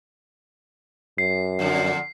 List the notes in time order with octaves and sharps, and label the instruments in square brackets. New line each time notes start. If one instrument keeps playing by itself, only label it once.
[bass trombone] F#2 [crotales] C7
[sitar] F2 A#2 D3